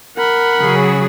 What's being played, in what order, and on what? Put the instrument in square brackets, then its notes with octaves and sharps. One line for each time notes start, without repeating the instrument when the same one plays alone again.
[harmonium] A#4 [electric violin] F#5 B5
[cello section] C#3 F#3 G#4